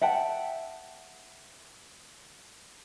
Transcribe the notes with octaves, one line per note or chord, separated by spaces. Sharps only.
E5 F#5 G5 A5